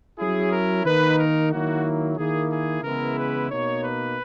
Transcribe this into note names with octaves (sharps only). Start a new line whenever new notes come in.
F#3 C#4 E4 G#4
A#4
D#3 A#3 D#4 B4
A#4
D#3 F#3 A#3 E4 F#4
D#3 A#3 E4 G#4
G#4
C#3 E3 G#3 B3 E4 A#4
B4
B2 A#3 D#4 C#5
B4